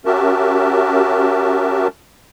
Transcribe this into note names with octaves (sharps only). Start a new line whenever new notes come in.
C#4 F#4 G4 A#4 E5 A5